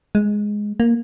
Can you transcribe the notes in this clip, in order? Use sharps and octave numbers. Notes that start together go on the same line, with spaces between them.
G#3
A#3